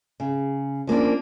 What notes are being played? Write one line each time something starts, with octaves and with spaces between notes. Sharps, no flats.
C#3
F3 A#3 C#4 D4